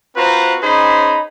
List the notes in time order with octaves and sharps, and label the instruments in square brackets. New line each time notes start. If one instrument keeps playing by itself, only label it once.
[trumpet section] C4 F4 F#4 B4 C5 A#5
C#4 D#4 G#4 C5 B5